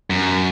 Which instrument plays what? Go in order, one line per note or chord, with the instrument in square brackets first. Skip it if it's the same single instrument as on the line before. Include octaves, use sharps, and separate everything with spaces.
[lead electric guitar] F#2